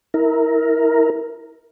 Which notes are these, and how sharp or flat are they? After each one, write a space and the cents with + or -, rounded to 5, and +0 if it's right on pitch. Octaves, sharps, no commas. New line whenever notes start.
E4 -25 A#4 +0